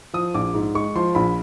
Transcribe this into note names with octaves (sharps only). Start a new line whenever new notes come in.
F3 D#6
A#1 D6
G#2
G#3 C#6
F3 C6
A#1 B5